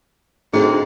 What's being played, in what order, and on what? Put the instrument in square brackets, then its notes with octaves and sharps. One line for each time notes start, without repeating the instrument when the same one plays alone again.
[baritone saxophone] D2 [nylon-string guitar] C4 D#4 [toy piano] G#4